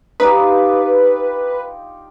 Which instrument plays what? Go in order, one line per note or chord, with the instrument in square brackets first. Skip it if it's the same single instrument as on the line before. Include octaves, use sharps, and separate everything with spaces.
[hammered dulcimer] D#4 F4 G4 [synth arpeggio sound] B4